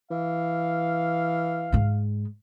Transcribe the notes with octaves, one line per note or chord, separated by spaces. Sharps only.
E3 F5
G#2 G#3